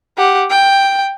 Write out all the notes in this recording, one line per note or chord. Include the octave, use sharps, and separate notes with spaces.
G4 F#5
G5